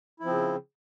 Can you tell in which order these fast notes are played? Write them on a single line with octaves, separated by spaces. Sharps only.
E4 F3 C4 C#3